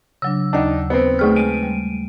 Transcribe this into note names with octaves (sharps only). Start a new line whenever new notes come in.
C#3 F#3 D4 E6
D#2 D4 D#4 F#5
B3 C4
A3 G#4 G5 C#6 D#6 F6
G#3 A3 D7 D#7
G3